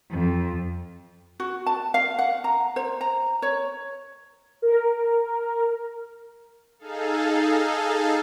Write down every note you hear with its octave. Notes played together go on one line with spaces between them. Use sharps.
F2
F#4
A5
F5
F#5
A#5
C5
A#5
C#5
A#4
D#4 G#4 A4 F5